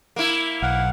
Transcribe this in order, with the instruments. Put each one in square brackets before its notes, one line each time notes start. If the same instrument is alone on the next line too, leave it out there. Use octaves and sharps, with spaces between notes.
[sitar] A#3 E4
[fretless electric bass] B1 [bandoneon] F5 F#5